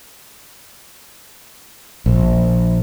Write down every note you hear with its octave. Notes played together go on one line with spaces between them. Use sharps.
A#1